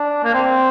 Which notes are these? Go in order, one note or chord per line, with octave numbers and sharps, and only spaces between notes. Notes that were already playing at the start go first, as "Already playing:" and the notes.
Already playing: D4
A#3
C4